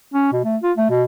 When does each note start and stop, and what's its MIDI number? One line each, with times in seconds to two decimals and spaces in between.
0.14 0.32 61
0.33 0.41 47
0.44 0.57 57
0.63 0.72 65
0.77 0.87 57
0.90 1.03 47